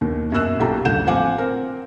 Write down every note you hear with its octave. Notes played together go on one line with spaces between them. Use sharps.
D#2 B2 D#3
F#2 B2 A#3 E6 F#6 E7
B1 F4 G4 A4 A#5
D#1 A1 D3 F#5 G6 E7
F3 C4 F5 F#5 G#5 D6
C4 A#4